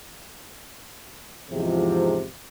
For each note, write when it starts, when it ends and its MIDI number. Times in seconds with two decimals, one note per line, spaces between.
1.51 2.23 40
1.51 2.23 44
1.51 2.23 48
1.51 2.23 53